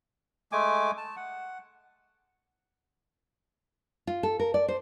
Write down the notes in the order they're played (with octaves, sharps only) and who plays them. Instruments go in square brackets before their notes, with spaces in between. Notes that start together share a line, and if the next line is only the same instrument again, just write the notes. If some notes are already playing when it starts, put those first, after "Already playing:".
[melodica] G#3 A3 G#5 D6
A5
F#5
[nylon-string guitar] F4
A4
A#4
D5
C5